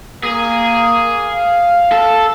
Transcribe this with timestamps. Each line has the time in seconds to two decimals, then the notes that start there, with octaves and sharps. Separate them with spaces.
0.23 A#3 G#4
1.16 F5
1.92 A4